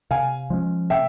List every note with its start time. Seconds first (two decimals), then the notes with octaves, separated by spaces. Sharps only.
0.11 C3 F5 G#5
0.50 F3 G#3 C#4
0.90 C3 E5 G5